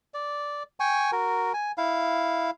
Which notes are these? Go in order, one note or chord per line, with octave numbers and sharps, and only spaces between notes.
D5
G5 G#5 C#6
F#4 A#4
G#5
E4 F5